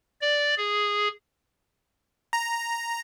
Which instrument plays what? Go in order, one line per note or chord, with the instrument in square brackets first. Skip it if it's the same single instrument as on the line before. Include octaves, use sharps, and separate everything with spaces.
[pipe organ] D5
G#4
[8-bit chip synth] A#5